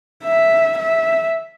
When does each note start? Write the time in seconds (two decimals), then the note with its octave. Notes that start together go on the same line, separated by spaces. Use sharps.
0.25 E5
0.78 E5